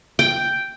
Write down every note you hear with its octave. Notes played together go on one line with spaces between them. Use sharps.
G5